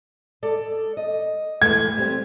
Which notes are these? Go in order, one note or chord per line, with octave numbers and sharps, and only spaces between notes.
G#3 A4 D5
D#5
E3 G#3 A3 G#6
G3 C4